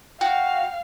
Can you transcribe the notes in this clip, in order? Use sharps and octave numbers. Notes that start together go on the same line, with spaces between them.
F#4 F5 G5